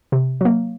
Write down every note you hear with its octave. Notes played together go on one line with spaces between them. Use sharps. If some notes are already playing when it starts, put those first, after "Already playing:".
C3
F#3 A#3